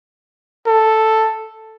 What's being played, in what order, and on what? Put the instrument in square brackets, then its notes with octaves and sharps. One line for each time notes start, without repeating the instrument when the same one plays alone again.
[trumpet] A4